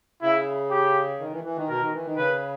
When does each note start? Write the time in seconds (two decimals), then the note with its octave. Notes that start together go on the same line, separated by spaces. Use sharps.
0.22 C#3 E4
0.71 G4
1.20 D#3
1.32 E3
1.44 E3
1.56 D#3
1.68 B2 A#4
1.81 D#3
1.93 E3
2.05 D#3
2.17 C#3 B4